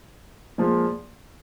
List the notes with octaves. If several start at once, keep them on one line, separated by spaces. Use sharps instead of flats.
A#2 F3 G#3